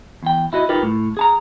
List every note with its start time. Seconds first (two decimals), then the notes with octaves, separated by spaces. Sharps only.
0.23 E2 G5
0.53 E4 F#4 D#5
0.69 D#4 F4 G4 A#4 B4
0.83 A2
1.17 G#4 A5 A#5